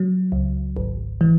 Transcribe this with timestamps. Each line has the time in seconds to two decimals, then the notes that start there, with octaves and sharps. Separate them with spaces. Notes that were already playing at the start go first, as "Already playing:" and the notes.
Already playing: F#3
0.32 C#2
0.77 G#1
1.21 E3